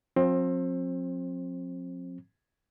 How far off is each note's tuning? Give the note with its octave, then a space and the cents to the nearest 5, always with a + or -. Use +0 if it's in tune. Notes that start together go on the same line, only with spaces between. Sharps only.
F3 +45 C4 +25